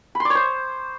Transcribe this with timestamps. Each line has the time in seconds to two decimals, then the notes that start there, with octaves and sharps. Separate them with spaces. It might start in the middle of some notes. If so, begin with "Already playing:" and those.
0.15 B5
0.20 C6
0.25 D5
0.30 C#5
0.35 C5